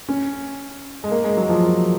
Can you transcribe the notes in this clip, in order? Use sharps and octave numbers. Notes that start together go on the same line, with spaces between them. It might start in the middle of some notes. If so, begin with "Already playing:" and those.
C#4
G#3
A#3
G#3
F#3
F3